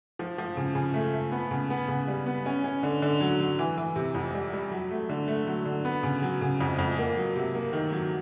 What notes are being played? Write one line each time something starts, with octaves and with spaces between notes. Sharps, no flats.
F3
F3
C#3
C#3
A3
A3
B3
C#3
B3
C#3
G3
B3
C#4
C#4
D3
D3
F#3
F#3
E3
E3
C3
F2
G3
G3
F#3
A3
D3
A3
F#3
D3
B3
C#3
F#3
C#3
F2
F2
A#3
F#3
C3
A#3
D#3
F#3